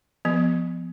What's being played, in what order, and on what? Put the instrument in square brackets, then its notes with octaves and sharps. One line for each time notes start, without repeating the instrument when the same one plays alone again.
[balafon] F3 B3